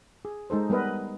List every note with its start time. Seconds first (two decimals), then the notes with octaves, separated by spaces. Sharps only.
0.25 G#4
0.50 G#3 D#4 A4 C5
0.70 G3 B3 A#4 B4 D#5